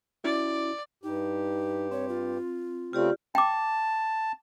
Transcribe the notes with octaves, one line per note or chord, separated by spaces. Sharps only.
C#4 E4 F#4 D5
G2 D#4 G4
C4 C#5
F4
C#3 A3 C4 F4 G4 D5
G5 A5 D6